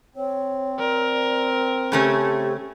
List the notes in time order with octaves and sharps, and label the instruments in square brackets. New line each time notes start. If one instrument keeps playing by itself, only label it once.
[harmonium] C4 [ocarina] C#5
[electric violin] A#4 [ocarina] D5
[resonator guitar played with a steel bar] C#3 A3 C#4 [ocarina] G4